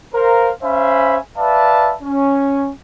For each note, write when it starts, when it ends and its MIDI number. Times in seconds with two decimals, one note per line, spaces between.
0.15 0.51 70
0.15 0.51 72
0.15 0.51 77
0.63 1.17 61
0.63 1.17 72
0.63 1.17 76
0.63 1.17 77
0.63 1.17 80
0.63 1.17 83
1.38 1.95 71
1.38 1.95 74
1.38 1.95 76
1.38 1.95 77
1.38 1.95 81
2.03 2.72 61